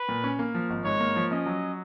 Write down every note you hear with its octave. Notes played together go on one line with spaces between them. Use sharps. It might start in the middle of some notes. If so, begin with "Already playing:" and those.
Already playing: B4
A#2
C#4
A#3
F3
G#1
G#2 C#5
A#3
F3
C#4 D#5
F#3